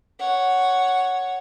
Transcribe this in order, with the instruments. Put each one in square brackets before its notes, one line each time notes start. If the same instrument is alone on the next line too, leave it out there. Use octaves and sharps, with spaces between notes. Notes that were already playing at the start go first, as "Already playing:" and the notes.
[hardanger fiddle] C#5 F#5